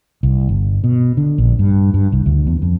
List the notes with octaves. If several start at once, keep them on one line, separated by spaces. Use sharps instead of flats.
C2
G1
B2
D3
A#1
G2
G2
C2
D2
E2
F2